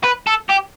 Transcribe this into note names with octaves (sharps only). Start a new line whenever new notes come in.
B4
A4
G4